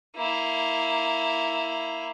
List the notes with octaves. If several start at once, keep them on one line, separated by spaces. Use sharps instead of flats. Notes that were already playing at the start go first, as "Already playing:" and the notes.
A#3 E4